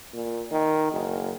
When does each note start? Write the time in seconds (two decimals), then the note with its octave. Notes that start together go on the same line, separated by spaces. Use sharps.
0.14 A#2
0.51 D#3
0.92 F#1